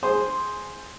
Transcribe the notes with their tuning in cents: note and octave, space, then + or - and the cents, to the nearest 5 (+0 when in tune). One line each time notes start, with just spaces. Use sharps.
G#4 +0 C5 +0